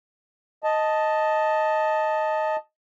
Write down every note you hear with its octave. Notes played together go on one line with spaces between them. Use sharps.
D#5 A5